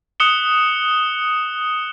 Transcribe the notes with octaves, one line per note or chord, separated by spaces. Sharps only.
D#6 F#6 C#7 E7 G7